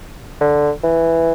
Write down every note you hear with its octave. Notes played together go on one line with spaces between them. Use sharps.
D3
E3